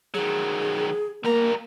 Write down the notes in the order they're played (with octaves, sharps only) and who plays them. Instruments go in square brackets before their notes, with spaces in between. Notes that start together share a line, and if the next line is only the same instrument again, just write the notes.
[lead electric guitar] D#3 F#3 [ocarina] G#4
[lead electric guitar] G3 A#5 [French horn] A#3 [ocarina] A#4